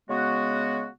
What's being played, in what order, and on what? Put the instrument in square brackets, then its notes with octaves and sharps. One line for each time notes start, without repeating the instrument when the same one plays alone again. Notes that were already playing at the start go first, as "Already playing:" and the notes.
[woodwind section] C#3 G#3 B3 F#4